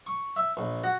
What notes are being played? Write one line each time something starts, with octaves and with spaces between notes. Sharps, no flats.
C#6
E5
A#1
F#4